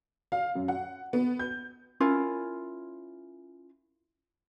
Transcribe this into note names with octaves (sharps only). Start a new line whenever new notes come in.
F5
F#2
F#5
B3
G6
C#4 E4 F4 A#4